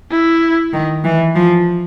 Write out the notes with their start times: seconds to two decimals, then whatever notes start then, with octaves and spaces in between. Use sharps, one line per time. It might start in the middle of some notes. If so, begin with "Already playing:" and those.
0.11 E4
0.73 D#3
1.04 E3
1.35 F3